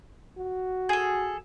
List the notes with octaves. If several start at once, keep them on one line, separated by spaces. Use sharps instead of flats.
F#4
G#4 A4